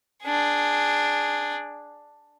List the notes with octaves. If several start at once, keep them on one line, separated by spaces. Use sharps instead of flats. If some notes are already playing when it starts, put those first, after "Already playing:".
D4 G#4